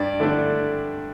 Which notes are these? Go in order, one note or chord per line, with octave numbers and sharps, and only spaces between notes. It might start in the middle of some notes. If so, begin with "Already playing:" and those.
Already playing: G2 D5
D3 A3 D4